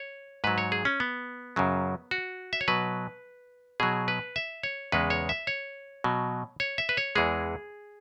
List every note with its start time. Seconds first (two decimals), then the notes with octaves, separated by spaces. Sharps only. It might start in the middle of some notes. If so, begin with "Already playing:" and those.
Already playing: C#5
0.44 G#2 F#3 B4
0.58 C#5
0.72 G#4
0.85 C#4
1.00 B3
1.56 F#2 C#3 F#3
2.11 F#4
2.53 E5
2.61 C#5
2.68 B2 F#3 B4
3.80 B2 F#3 G#4
4.08 B4
4.36 E5
4.63 C#5
4.92 E2 C#3 G#3 B4
5.10 C#5
5.29 E5
5.47 C#5
6.04 B2 F#3
6.60 C#5
6.78 E5
6.89 B4
6.97 C#5
7.15 E2 E3 G#3 G#4